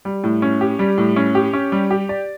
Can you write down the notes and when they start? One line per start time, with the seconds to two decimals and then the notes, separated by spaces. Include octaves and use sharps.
0.05 G3
0.24 A2
0.42 C#4
0.61 G4
0.79 G3
0.98 A2
1.16 C#4
1.35 G4
1.53 C#4
1.72 G3
1.90 G4
2.09 D5